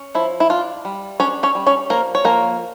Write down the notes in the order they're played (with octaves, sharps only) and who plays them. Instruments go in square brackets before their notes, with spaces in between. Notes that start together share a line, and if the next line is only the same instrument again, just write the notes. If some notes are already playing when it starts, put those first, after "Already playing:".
Already playing: [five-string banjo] C#4
F3 E4
E4
D4 F4
G3
C#4 D4 C#5
C#4 C#5
G3
C#4 C#5
F3 A#3 A#4
C#5
F3 A#3 A#4